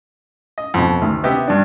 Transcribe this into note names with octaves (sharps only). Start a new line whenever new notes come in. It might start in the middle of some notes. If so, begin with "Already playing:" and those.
D#5
F2 B2
D2 D#3
C3 B3 G4 D#5 E5
G2 D4